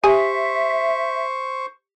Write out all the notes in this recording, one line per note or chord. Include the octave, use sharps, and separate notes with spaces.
G4 C5 E5 G#5 C#6